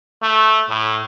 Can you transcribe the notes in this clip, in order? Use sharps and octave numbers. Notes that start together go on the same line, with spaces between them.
A3
A2